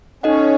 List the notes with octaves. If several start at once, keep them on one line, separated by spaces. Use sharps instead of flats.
C#4 D#4 A4 D#5 F#5